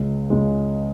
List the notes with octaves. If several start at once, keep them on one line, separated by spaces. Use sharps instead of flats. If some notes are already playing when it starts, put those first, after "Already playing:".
Already playing: C#2 C#3 G#3
C#2 C#3 G#3